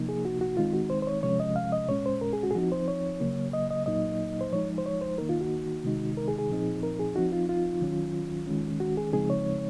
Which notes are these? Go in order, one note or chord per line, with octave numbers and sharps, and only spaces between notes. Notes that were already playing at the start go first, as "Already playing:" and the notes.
Already playing: C3 F3 A#3 D#4
G#4
F#4
F#4
D#3 G#3 C4 D#4 F4
F#4
C5
C5
C#5
C3 F3 G#3 C#4 C#5
D#5
F5
D#5
A#2 G#3 C#4 C#5
C5
A#4
G#4
F#4
G#4
F3 C4 D#4 F#4
C5
C#5
C#3 F#3 A#3
D#5
D#5
A#2 F#3 A#3 D#4 D#5
C5
F3 G#3 D#4 C#5
C5
C#5
C5
D#3 A#3 D#4 A#4
F4
F#4
C3 D#3 G#3 D#4
A#4
G#4
G#4
A#2 F3 C4 D#4
A#4
G#4
F3 C4 D#4 F#4
F4
F4
D#3 F#3 C#4
D#3 G#3 C#4
F#4
G#4
C#3 F3 G#3 C4 D#4 G#4
C#5